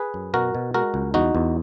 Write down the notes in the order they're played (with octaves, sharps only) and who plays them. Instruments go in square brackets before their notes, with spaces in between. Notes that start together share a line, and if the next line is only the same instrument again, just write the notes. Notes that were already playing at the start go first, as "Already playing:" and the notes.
Already playing: [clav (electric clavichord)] G#4 B4
F#2
B2 F#4 A#4
B2
G#3 F#4 A#4
C#2
E2 D#4 F#4
E2